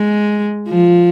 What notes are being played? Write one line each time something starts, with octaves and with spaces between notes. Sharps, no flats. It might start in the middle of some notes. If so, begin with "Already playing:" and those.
Already playing: G#3
F3